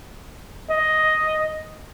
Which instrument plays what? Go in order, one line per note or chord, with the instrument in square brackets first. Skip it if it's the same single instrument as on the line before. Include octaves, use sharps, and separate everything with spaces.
[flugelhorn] D#5